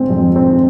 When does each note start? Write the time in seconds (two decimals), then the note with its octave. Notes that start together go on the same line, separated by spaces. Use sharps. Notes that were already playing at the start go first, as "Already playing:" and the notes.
Already playing: G#3 C4
0.10 F2
0.36 C4